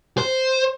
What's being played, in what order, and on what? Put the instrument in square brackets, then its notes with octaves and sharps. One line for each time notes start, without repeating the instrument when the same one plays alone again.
[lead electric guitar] C5